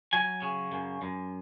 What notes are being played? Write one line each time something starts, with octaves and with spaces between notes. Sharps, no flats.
F#3 G#5
C#3
F#2
F#2